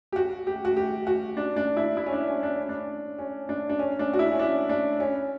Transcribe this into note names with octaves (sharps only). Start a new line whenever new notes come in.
G4
F#4
G4
F#4
G4
F#4
D4
D4
E4
E4
C#4
D4
C#4
D4
C#4
D4
C#4
D4
D4
C#4
D4
F#4
E4
C#4
D4
D4
C#4